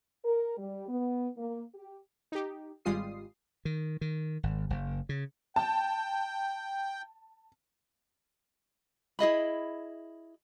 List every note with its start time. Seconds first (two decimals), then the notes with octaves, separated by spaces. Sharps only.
0.25 A#4
0.58 G3
0.89 B3
1.38 A#3
1.75 G4
2.32 D#4 G4
2.85 G#1 G3 G#3 F4 D#6 C7
3.65 D#3
4.01 D#3
4.43 G#1
4.70 F#1
5.09 C#3
5.56 G5 A5
9.19 E4 G#4 D#5 B5